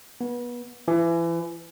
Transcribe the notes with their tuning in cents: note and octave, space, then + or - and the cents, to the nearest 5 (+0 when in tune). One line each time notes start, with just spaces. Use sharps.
B3 -30
E3 +30